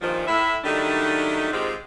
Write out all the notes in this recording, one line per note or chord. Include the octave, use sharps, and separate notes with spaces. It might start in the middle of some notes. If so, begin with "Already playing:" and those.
G2 A#2 D#3 F3
A2 E4 E5
D#3 F#3 G3 A3 D4 D#4
G#2 D#3 G#3 C4 F4 G4